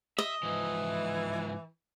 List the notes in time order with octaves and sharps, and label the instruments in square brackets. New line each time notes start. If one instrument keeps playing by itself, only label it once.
[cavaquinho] D#5 [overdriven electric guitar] E5
[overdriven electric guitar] G#2 F3 [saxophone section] E3